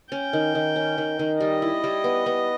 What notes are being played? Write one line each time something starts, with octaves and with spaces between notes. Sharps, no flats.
C#4 G5
D#3
D#3
C#4
D#3
D#3
G3 D#5
E4
G3
B3
B3